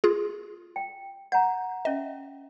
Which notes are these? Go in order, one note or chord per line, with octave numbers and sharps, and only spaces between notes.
F4 G#4
G5
F#5 A#5 G6
C#4 D#5 E5